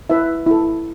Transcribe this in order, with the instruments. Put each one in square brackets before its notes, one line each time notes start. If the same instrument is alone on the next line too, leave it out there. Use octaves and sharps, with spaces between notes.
[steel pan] E4 B4 E5
E4 A4